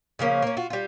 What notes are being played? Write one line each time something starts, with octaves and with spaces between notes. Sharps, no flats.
C#3 F3 A#3 C#4
A#3 C#4
F4 F#4
G3 F4